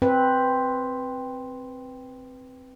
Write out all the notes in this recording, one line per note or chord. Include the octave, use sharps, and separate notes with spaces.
C4 B4